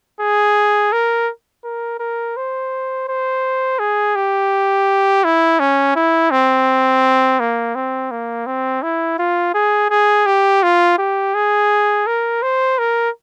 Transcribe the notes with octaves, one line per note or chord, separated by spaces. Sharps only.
G#4
A#4
A#4
A#4
C5
C5
G#4
G4
E4
C#4
E4
C4
A#3
C4
A#3
C4
E4
F4
G#4
G#4
G4
F4
G4
G#4
A#4
C5
A#4